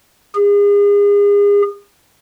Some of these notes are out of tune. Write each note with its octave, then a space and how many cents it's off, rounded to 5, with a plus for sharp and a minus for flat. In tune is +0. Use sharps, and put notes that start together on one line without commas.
G#4 -35